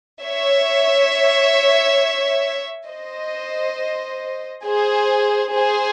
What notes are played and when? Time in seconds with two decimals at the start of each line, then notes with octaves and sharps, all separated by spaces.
0.22 C#5 E5
2.87 C5 D#5
4.64 G#4 C5
5.52 G#4 C5